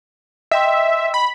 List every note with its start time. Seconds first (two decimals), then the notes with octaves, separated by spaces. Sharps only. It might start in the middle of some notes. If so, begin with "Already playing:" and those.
0.51 D#5 E5 G5 C6
1.14 B5